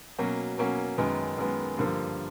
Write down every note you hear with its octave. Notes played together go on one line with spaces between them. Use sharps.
B2 F#3 A#3 C#4 F#4
B2 F#3 A#3 C#4 F#4
F#2 D#3 G#3 B3
F#2 D#3 G#3 B3
G2 D3 F3 A#3